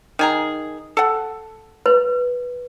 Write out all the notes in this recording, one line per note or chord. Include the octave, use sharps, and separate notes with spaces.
D#3 G#4 A#5
A4 F#5
B4